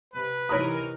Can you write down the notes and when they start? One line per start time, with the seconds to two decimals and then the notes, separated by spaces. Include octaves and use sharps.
0.13 C3 B4
0.49 C3 E3 D#4 A#4 C#5 B5 D#6